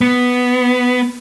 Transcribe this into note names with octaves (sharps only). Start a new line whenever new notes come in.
B3